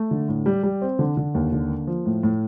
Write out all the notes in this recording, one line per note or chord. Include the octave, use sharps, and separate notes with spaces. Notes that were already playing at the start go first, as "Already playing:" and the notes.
Already playing: A3
D3
A2
G3
G3
C4
D3
D3
D#2
D3
A#3
F3
A2
A2